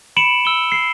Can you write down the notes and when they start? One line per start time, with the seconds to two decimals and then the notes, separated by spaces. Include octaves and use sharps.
0.16 B5 C#7 D7 E7 F#7
0.45 E6 G7
0.72 C7